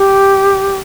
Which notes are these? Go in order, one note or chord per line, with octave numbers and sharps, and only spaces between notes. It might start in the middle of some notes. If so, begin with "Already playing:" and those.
Already playing: G4